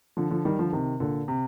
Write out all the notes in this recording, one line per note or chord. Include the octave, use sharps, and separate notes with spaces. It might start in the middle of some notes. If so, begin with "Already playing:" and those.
D3 F3
D3 F3
D#3 G3
D3 F3
C3 D#3
A#2 D3
C3